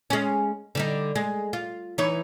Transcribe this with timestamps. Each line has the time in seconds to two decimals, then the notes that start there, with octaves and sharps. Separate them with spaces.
0.10 G#3 C#4
0.75 D3 G3 D#4
1.15 G#3
1.53 F4
1.98 E3 D#4 C#5